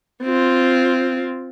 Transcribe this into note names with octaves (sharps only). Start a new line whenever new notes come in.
C4 F4